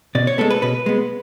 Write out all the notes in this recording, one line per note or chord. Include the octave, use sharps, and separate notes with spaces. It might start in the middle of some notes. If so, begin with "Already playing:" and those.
B2 D5
C#5
G#3 B3 A4
B4
B2 B4
G#3 B3